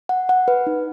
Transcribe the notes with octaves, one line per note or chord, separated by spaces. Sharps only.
F#5
F#5
B4
D#4